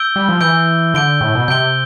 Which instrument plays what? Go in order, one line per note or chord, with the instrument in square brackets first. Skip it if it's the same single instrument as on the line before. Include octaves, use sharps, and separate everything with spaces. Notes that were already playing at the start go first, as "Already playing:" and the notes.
Already playing: [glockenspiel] E6 G6 D7 G7
[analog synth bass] G3
F3
[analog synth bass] E3 [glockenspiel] E6 G6 D7 G7
[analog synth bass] D3 [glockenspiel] G6 D7 G7
[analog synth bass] A2
B2
[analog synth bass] C3 [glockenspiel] G6 D7 G7